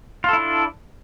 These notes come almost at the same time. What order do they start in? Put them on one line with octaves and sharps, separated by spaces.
F4 A4 E4 D4